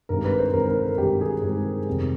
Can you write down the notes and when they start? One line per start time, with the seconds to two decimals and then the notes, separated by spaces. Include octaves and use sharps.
0.09 G2 D#3 G#3 C4 A#4
0.25 B4
0.39 C5
0.54 G2 D#3 G#3 C4 A#4
0.68 A#4
0.84 A4
0.98 G2 D#3 G#3 C4 G4
1.21 G#4
1.42 G2 D#3 G#3 C4 A#4
1.87 F2 C3 D#3 G3